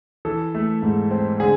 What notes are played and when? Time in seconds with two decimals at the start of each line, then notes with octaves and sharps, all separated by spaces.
0.25 E3 A4
0.55 A3
0.82 G#2
1.11 C4
1.40 D3 G#4